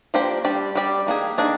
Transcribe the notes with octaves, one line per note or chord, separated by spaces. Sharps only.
F3 A#3 D4 G4 C5
G3 D4 G4 D5
G3 D4 G4 D5
D#3 A#3 D4 G#4
D#3 A#3 D4 G#4